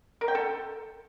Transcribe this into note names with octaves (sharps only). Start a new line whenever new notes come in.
A#4
G5
A4